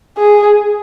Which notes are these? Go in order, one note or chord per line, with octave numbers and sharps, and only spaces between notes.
G#4